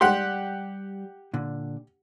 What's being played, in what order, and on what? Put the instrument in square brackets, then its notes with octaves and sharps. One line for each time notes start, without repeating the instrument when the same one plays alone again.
[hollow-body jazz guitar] G3 C6 [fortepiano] G4 F#5
[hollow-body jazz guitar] A#2 D3